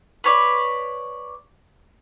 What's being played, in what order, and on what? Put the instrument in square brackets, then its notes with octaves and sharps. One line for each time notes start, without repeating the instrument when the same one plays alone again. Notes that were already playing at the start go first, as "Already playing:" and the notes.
[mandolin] B4 C#5 D5